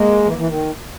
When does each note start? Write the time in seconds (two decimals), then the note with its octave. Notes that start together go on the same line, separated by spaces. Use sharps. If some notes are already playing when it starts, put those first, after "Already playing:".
Already playing: G#3 A#3
0.25 E3
0.38 E3
0.48 D#3